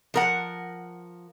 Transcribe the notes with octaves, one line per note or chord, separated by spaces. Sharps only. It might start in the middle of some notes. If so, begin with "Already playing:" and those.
F3 A#4 F#5